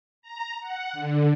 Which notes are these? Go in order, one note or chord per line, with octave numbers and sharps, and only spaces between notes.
A#5
F#5
D3